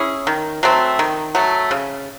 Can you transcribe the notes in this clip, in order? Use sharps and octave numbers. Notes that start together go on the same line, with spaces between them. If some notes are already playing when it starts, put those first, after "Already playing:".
Already playing: C#4 E4 G#4
D#3
F#3 A3 C4
D#3
F#3 A3
C#3